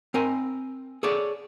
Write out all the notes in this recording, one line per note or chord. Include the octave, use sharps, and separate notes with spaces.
C4 A#4 G#5
G#4 A4 C#5 D5